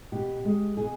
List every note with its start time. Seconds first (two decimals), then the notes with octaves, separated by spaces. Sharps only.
0.12 B2 G4
0.45 G#3
0.77 B2 G#4